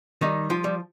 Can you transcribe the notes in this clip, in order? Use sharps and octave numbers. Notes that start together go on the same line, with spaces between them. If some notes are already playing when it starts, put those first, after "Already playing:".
D#3 G3 D#4
F3 F4
G3